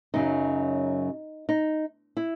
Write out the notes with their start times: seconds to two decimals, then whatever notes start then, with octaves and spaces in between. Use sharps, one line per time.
0.14 F#2 C#3 F#3 D#4
1.49 D#4
2.17 E4